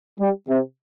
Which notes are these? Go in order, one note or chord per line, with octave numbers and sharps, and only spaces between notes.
G3
C3